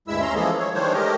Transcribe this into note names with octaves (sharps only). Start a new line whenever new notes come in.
D2 G2 G#3 E4 E5 E6
C#4 A#5 C6
E3 F3 G#3 A#3 G#4 A4
C#5
D#3 E3 G3 D4 C5 C#5
G#3 A3 G4 A#4 D#5